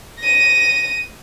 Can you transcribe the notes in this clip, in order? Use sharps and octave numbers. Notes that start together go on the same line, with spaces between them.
A#6 D#7